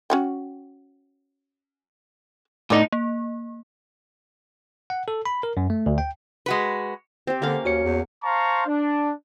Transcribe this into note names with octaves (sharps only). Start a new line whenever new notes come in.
C#4 F#4 G5
A2 D3 B3 D#4 D5
A#3
F#5
A4
B5
A#4
F#2
A3
D2
G5
G#3 F#4 B4
C4 G4
D3 A#3 C#4 F5
D#2 F#4 C#5 C#7
E2
C5 F5 A5 A#5 C6 C#6
D4